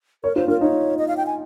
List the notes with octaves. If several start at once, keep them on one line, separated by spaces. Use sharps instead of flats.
A#4 C#5
F4 C5
F4 A#4
D#4 C#5
D#5
F5
G5
G#5